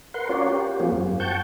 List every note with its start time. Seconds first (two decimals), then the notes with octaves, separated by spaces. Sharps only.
0.14 A#4 B4 F#5 C6
0.29 C#4 F4 F#4 A#4 C#5 D5
0.46 G4
0.80 F3 A#3 C4 F4 F#4 G#4
0.92 F#2
1.20 F#5 G5 A5 C#6 G6